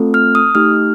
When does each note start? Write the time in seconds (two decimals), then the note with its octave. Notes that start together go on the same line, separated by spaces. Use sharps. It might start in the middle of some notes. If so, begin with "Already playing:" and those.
Already playing: A3 C4 F4 A4
0.14 F6
0.35 D#6
0.55 A3 D#4 G4 F6